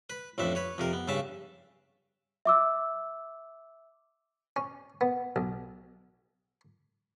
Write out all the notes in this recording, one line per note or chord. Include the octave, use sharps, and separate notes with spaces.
B4
A1 F2 A2 D4 E5
B4 C#5
F2 C3 A#4
B3
G2 C#3 E5 A5
E5 D6 E6
C#4
B3
B1